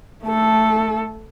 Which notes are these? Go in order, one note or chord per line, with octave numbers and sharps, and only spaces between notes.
A3 A4